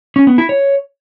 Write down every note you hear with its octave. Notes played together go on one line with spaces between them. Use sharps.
C#4
B3
E4
C#5